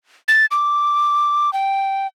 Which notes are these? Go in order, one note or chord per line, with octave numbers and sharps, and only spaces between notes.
A6
D6
G5